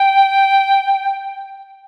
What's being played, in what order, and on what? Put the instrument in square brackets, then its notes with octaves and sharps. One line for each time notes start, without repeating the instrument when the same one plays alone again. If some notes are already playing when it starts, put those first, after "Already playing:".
Already playing: [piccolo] G5